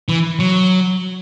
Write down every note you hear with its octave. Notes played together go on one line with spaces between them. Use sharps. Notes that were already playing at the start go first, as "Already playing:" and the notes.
E3
F#3